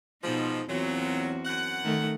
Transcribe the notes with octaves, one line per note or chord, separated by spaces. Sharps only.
G#2 B2 F3 D#4
E2 A#2 F#3 C4 F#4
F#2 F#5
D#3 A3 D#4